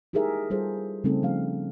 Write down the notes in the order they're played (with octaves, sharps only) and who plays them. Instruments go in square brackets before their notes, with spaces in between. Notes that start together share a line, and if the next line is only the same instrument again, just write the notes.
[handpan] D#4 E4 G4 G#4 A#4 E5
G3 F4 G#4 A4 C5
C#3 G3 A3 C4 D#4 A4
F3 A3 F5